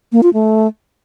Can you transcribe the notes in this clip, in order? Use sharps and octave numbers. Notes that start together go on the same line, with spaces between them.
A#3
F4
A3